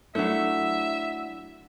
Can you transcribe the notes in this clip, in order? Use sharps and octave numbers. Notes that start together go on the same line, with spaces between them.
F#3 A3 D4 E4 E5